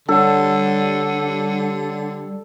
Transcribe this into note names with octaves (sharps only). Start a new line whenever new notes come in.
D3 G3 D4 A4 C#5 F#5